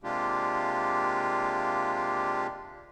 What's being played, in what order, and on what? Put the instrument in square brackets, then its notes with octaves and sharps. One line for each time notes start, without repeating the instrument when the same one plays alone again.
[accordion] C3 G#3 A#3 D4 F4 G4